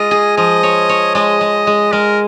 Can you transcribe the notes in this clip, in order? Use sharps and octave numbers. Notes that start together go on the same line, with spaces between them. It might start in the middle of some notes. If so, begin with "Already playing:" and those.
Already playing: G#3 F4 D#5
G#4
F3 D#5
C#5
C#5
G#3 D#5
G#3
G#3
G#3 A#4